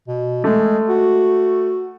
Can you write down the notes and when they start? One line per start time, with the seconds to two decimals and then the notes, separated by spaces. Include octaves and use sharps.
0.08 B2
0.44 G#3 A3
0.89 F#4